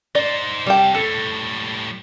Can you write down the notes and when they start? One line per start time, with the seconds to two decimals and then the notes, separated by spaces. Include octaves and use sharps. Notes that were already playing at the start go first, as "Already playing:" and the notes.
0.15 D#4 C5 D5
0.66 C3 G3 G5 A5
0.95 A2 G3 A4